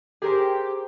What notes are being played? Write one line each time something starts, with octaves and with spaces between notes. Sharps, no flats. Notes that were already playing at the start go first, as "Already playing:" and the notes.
G4 G#4 A#4 C5